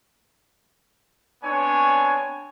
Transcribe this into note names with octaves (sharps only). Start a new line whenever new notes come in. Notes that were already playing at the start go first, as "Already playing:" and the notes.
B3 C4 D4 C#5 G#5